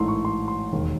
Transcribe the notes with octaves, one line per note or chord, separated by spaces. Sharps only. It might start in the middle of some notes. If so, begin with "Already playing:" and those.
Already playing: A1 G#2 E3 A3 D#4 A5 C6
C#6
C6
C6
E1 D#2 D#3